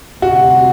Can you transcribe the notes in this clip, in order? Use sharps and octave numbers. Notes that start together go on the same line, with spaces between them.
D2 C3 G3 C4 F#4